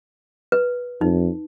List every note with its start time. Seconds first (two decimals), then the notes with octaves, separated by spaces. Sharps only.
0.52 B4
1.01 F2 D#4